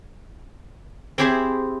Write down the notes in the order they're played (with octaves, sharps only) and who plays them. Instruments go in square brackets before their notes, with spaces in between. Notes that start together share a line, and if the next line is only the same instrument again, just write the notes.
[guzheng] C4 E4 G4 G#4 C5 E5